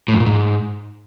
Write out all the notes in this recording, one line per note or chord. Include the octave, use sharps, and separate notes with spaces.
A2
F2
A#2
G#2